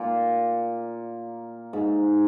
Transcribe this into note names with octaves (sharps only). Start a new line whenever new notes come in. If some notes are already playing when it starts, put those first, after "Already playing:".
Already playing: A#2
G#2